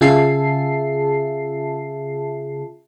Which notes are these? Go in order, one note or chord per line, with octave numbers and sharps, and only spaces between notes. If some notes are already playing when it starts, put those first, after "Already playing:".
C#3 F4 G#4 E5 A5 C7